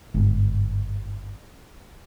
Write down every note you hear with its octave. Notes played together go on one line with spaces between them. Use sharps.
G1 G#2